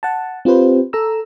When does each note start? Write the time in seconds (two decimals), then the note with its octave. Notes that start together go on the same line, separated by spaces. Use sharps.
0.03 F#5 A5
0.45 C4 F4 G4 B4 C5
0.93 A4 A#5 E6